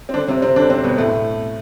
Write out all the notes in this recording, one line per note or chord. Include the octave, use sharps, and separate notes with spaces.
C4
D3 D4
C3 C4
C3 C4
D3 D4
C3 C4
B2 B3
A2 A3